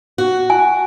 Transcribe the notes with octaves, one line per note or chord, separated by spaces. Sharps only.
F#4
G#5